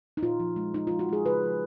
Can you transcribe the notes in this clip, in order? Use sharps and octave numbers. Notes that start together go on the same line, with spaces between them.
D#4
A#2 F4
F3
G#3
A#2 D#4
F3 F4
F#4
G#3 G#4
C#3 B4
F3